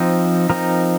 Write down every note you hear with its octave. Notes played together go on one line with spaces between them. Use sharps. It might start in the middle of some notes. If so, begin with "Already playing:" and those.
Already playing: F3 C4 D#4
F3 C4 D#4 A#4